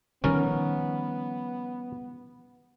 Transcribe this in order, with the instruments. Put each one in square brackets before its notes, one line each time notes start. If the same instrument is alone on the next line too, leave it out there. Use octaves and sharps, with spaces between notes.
[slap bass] D#3 F3 G3 [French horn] B3 [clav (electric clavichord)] C#4 A#4